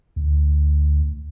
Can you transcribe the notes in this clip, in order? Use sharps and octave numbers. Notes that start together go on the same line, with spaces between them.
D2